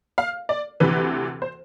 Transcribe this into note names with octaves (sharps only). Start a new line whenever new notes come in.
F5
D5
D2 C3 E3 B4
C5